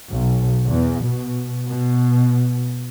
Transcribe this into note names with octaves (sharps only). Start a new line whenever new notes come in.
B1
E2
B2
B2